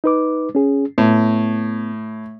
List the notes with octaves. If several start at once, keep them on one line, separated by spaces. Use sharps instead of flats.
D#4 B4 D6
C#4 G#4
A2 B3